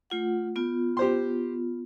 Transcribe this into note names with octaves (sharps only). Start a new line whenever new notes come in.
A3 F4 F#5
B3 F4
G4 C5 C6